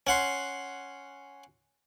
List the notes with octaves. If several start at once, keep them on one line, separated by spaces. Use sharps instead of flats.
C#4 F#5 C6